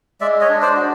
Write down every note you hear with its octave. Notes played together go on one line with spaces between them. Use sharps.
G#3 D5 E5
C#5 D#5
D4
C5 D5
F#4